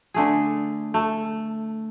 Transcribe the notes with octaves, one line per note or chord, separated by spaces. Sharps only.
D3 A3 G#4
A3